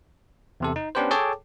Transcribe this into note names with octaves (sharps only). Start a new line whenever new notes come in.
E2 C3 A4
D#4
B3 C#4 D4 G4 B4 C5
G#4 A4 C#5 G5 A5 D6